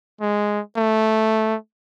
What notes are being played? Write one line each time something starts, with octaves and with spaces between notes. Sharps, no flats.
G#3
A3